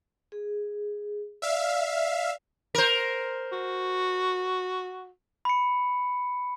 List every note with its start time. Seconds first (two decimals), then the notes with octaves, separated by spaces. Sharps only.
0.32 G#4
1.42 D5 E5 F5
2.75 A#4 C5
3.52 F#4
5.45 B5 C#7